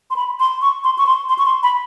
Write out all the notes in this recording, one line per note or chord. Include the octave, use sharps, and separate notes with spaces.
C6
B5
C6
C#6
C6
C#6
C6
C6
C#6
C6
B5